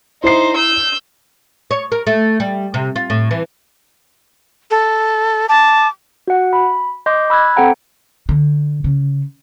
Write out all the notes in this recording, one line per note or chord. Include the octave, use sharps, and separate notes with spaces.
D#4 E4 C5 C7
E6 G6
C#5
A#4
A3
G3
C3
F4
A2
E3
A4
A5 D6
F#4 F#5
B5
D#5 C6 D6 G6
B5 E6 F#6 G#6
C4 A4 F#5 G5 A#5
D3
C#3